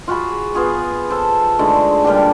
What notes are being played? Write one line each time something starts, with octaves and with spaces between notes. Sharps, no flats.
F4 F#4 G#4 B5
B3 F4 G#4
A4 C5
D3 G#3 A3 D#4
A#2 G3 D4 G4